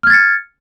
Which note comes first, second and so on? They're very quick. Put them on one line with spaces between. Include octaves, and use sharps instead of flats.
F6 G#6 A6 C#7